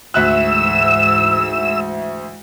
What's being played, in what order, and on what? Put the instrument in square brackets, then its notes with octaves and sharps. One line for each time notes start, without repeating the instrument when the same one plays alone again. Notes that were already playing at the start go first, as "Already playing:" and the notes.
[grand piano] D2 E5 F#6 [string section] G#2 E3 [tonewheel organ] E6